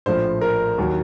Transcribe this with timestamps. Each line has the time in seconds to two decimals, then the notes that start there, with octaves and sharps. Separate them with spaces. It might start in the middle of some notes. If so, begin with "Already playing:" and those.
0.06 A#1 A2 F3 C5
0.41 A#4
0.78 D#2 D#3 F#3